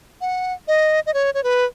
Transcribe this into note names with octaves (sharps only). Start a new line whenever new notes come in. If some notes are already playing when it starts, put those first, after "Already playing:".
F#5
D#5
D#5
C#5
C#5
B4